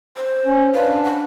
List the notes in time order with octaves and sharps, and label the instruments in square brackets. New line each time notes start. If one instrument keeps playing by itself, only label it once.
[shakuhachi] C5
[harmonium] C#4
[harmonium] D4 B4 [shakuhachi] F5
[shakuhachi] F#5